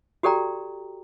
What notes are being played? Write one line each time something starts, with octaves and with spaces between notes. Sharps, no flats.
F#4 G4 A4 D5 G5 A#5